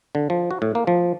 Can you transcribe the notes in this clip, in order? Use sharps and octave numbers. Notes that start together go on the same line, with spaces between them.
D3
F3
F#4
A2
A#3
F3